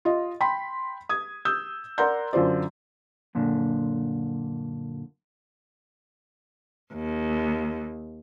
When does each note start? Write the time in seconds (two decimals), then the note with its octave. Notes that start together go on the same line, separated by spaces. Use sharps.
0.05 F4 D#5
0.40 G5 B5 C6 B6
1.09 D#6 G#6
1.45 D#6 E6 G6
1.98 A#4 D5 F#5 A#5 C6 G6
2.33 F#2 D3 F4 C5 D5
3.35 F#2 A#2 D3
6.93 D#2